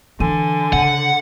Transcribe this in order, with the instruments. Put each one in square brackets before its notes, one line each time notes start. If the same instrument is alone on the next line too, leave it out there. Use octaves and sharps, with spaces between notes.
[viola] D3 [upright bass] E3 [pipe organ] G#5
[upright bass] C#3 [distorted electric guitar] F#5